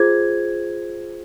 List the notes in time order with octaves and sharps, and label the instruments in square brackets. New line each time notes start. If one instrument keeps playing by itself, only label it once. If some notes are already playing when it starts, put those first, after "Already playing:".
Already playing: [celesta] F4 G#4 C5 G#6